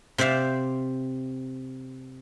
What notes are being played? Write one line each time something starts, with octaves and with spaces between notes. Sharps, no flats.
C3 C5 D5 E5 F5